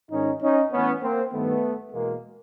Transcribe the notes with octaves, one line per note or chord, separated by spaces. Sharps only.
G#2 D#3 C#4 D#4
C#4 D#4
A2 E3 B3 C#4
A#3 C4
G2 D#3 A3 B3
E2 B2 G#3 A#3